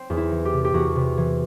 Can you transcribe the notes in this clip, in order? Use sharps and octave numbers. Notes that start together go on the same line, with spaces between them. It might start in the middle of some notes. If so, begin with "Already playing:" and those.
Already playing: C4
E2
E4
E3
G4
C3
G4
E2 F#4
C3
E3